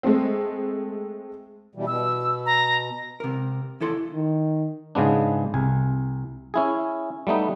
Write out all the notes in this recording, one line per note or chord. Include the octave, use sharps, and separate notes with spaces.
G#3 A3 C4
B2 E3 G3
B2 E6
A#5
C3 A#4
E2 E4 A4 C6
D#3
G#2 C#3 G#3 B3 D4
C2 G#5
C#4 E4 G#4
G3 A3 B3 D#4